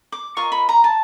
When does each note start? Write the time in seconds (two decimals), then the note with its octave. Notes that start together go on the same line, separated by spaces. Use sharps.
0.12 D6
0.37 F4 A#4 D#5 C#6
0.52 B5
0.69 A#5
0.84 A5